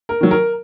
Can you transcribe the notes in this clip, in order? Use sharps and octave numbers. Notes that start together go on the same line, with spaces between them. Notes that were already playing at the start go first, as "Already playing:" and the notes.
A#4
D#3 F#3
A#4